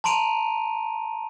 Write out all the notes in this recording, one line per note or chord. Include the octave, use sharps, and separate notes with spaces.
A5 A#5 C6 D7 D#7 F7